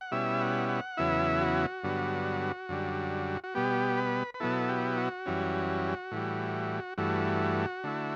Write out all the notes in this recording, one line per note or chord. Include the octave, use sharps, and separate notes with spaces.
F#5
B2 G3 C#4 E4 E5
F#5
F#5
E2 C#3 F#3 B3 E4 E5
F#4
G2 D3 F#3 B3
F#2 D3 G3
F#4
B2 G3 B3 G4
B4
B4
B2 F#3 B3 E4 A4
G4
F#4
F#2 E3 G3 C#4
A2 E3 G3
G2 E3 A3 F#4
D3 A3 E4